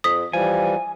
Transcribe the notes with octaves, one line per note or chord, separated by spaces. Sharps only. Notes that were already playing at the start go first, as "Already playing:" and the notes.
F2 D#6 B6
E3 F3 G3 G#5